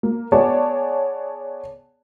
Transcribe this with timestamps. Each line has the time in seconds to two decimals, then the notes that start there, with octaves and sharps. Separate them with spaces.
0.03 A#3
0.32 B3 G#4 C#5 D5 A5